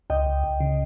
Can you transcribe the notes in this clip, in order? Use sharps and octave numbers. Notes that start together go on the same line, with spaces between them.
C#2 D#5 G5
C#2
C#2
C#3